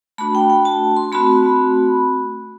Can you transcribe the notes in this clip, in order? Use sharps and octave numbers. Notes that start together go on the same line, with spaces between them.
A3 D4 F#4 B5
G5
G5
A5
C6
A3 C4 F#4 B5